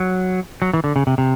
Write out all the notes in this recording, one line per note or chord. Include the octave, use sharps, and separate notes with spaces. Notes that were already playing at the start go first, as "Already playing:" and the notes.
Already playing: F#3
F#3
E3
D3
C#3
C3
C3